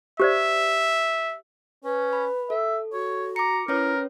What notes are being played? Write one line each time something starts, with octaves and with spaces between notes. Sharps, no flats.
G4 C5 D5 E5
C#4 B4
B5
A4 E5
F#4 C#5
A#5 D6 C#7
C#4 E4 A#4 B4 C#5